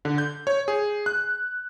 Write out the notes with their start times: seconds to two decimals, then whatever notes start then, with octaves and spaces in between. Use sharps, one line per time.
0.05 D3
0.18 G6
0.47 C#5
0.68 G#4
1.06 F#6